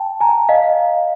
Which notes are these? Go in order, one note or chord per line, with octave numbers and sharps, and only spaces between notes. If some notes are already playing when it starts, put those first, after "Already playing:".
Already playing: G5 A5
G#5 A#5
D#5 F5